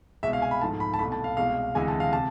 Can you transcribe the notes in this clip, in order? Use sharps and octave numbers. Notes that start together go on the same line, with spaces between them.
C2 B2 G#3 E5
F5
G#5
B5
G#2 F3 A3 A5
B5
A5
C2 B2 A3 B5
A5
F5
C2 B2 G#3 F5
D2 C3 E3 G#3 G#5
A5
F5
C3 A5